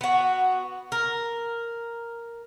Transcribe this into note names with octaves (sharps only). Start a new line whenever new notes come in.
B3 F#4
A#4